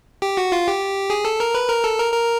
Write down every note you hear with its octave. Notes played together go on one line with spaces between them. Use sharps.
G4
F#4
F4
G4
G#4
A4
A#4
B4
A#4
A4
A#4
A#4